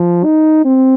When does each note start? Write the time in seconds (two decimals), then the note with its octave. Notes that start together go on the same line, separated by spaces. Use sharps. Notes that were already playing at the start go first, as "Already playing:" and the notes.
Already playing: F3
0.24 D#4
0.65 C4